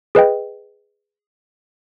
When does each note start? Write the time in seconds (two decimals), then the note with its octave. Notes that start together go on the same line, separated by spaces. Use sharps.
0.15 G#4 B4 D#5 G5